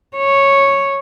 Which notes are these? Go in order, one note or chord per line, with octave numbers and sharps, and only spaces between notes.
C#5